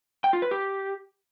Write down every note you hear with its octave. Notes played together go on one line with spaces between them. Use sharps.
G5
F4
B4
G4